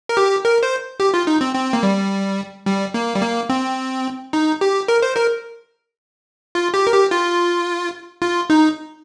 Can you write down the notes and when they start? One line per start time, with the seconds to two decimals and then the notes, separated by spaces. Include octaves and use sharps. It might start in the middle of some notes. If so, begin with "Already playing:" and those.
0.09 A#4
0.17 G4
0.45 A#4
0.63 C5
1.00 G4
1.14 F4
1.27 D#4
1.41 C4
1.55 C4
1.73 A#3
1.83 G3
2.66 G3
2.94 A#3
3.15 G3
3.22 A#3
3.50 C4
4.33 D#4
4.61 G4
4.88 A#4
5.02 C5
5.16 A#4
6.55 F4
6.74 G4
6.87 A#4
6.92 G4
7.11 F4
8.22 F4
8.50 D#4